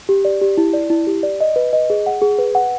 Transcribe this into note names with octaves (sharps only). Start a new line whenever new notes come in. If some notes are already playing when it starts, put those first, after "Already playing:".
G4
D5
G4
E4
D5
E4
G4
D5
D#5
B4
D#5
G#4
F#5
G#4
B4
F#5